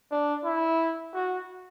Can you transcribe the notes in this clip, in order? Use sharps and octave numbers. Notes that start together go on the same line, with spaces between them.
D4
E4
F#4